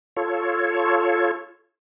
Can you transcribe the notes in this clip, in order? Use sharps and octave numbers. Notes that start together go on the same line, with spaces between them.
F4 A4 C#5